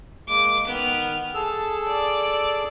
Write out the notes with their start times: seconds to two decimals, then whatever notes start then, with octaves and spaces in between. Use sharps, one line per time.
0.28 G#3 A#3 D6
0.67 D#3 B3 F6
1.34 G#4 A4 A5 E6
1.88 D5